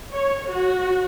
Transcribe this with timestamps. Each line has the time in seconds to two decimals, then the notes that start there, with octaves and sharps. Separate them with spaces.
0.13 C#5
0.48 F#4